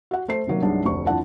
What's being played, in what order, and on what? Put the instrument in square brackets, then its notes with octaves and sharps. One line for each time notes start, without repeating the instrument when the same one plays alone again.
[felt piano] F#4 F#5
A3 C5 C7
C3 D#3 F#3 A#3
C2 G2 F#3 G#3 D4 D#4
F1 D2 C#6
F2 E3 F3 D4 F#5 A5